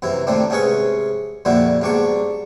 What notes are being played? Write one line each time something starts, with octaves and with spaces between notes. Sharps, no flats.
F#2 C3 E3 E4
A2 D#3 A3 C4 D4
G#2 C3 C#4 G#4 B4 C#6
F2 A#2 D3 G3 E4 F#4
B1 G#2 G3 D4 C6 C#6